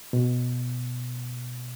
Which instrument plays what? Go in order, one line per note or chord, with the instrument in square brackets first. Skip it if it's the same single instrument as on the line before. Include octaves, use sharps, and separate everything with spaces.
[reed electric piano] B2